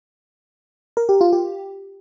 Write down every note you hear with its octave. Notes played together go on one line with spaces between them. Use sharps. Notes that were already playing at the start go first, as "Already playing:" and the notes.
A#4
G4
F4
G4